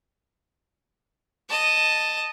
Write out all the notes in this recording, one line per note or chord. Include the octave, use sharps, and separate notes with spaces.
D#5 A5